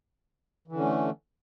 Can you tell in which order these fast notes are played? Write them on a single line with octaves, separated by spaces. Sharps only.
E3 D3 C#4 A3